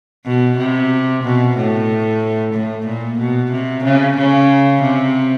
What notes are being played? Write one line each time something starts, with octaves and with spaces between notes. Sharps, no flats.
B2
C3
B2
A2
A2
A#2
B2
C3
C#3
C#3
C3